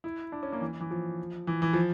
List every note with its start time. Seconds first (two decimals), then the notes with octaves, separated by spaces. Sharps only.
0.04 E4
0.32 D4
0.43 C#4
0.52 A#3
0.61 E3
0.80 E3
0.91 F3
1.47 E3
1.62 E3
1.73 F3